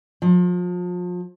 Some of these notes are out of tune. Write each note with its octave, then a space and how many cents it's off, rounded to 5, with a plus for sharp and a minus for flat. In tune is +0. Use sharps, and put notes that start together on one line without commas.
F3 +35